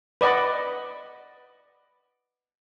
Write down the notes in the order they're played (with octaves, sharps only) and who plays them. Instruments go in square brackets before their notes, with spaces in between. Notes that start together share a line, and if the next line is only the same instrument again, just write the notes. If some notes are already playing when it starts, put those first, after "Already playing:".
[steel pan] B4 D5 D#5 F#5 B5